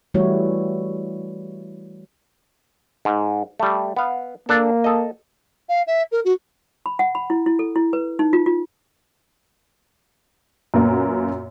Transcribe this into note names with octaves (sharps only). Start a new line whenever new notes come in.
E3 G3 A3 E4 F#4 C#5
G#2
G3 A3
B3 F5
A#3 D4 A4
A4 D#5
F5
E5
A#4
F#4
B5
F#5
B5
E4
E4
A4
E4
B4
D#4
F4
F4
F#2 A#2 A#3 B3